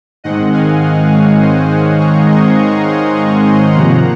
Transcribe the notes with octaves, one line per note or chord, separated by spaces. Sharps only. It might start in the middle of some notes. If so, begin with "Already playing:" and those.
G#2 D#3 G#3 C4 D#5 F#5
F5 G#5
D#5 F#5
C#5 F5
C5 D#5
C#5 F5
A#5 C#6
C6 D#6
A#5 C#6
C6 D#6
A#5 C#6
G#5 C6
C3 F3 A#3 F#5 A#5